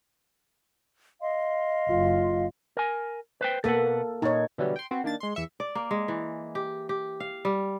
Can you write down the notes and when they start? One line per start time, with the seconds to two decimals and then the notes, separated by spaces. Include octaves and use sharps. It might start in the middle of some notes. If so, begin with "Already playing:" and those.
1.21 D#5 F5 C6
1.90 F#1 F4
2.77 A#4 G#5
3.41 B4 C5 G5
3.64 B2 A#3 A4 B4 F#5
4.22 A#2 D#4 C#5
4.58 B2 D3 E3 F#3 G3
4.76 G5 C6
4.91 B3 C4 F#4
5.04 D#3 A#3 D4 A6
5.20 G#3 C6
5.35 E2 E5 C#7
5.60 D5
5.75 A#3
5.91 G#3
6.08 E3
6.55 G4
6.89 G4
7.20 F5
7.45 G3